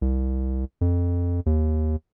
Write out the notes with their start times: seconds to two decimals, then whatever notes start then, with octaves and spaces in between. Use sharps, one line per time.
0.02 C2
0.81 F2
1.46 D#2